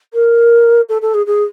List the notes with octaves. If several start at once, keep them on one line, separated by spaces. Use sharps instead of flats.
A#4
A4
A4
G#4
G#4